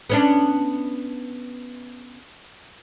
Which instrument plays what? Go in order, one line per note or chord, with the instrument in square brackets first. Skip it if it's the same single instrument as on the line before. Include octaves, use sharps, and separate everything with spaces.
[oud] B3 C#4 D4